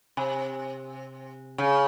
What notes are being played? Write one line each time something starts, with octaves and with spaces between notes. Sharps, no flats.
C3
C#3